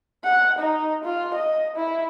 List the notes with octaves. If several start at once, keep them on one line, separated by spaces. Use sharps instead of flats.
F#5
D#4
F4
D#5
E4